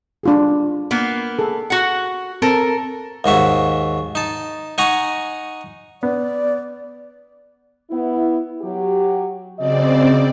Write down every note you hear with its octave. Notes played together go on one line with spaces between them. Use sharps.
D4 F4 G#4
A#3 B3
G#4 A4
F#4 F#5
C4 A4 A#4
D#2 G#2 F#4 E5
D#4 A5
D#4 F#5 G#5 A#5 C#6
B3 D5
B3 E4
F#3 G4
C#3 F#3 C4 G#4 D5 D#5